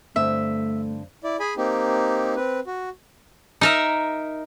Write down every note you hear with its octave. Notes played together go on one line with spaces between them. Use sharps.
G2 D3 A3 C4 E5
E4 D5
G#4 G#5 B5
A#3 C4 D#4 G4
C4 B4
F#4
D#4 A#4 E5